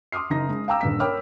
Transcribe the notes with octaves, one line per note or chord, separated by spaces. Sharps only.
C6 D6 D#6 F6 C7
F#1 D#4 A#6
G#3
F5 G5 A#5 D6 E6
D#1 G2 B6
A#4 C#5 G5 B5 D6 F6